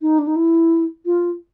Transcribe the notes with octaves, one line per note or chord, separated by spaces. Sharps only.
D#4
D4
D#4
E4
F4